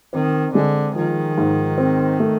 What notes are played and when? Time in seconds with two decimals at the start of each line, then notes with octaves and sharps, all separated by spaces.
0.13 D#3 C4
0.54 D3 G#3
0.96 D#3 F3
1.38 G#2
1.78 C4
2.20 A3